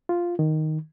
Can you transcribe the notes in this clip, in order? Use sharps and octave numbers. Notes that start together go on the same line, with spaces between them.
F4
D#3